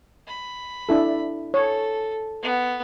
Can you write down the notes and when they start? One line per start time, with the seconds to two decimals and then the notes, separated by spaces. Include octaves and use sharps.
0.27 B5
0.89 D4 E4 A4
1.54 A4 C#5
2.42 B3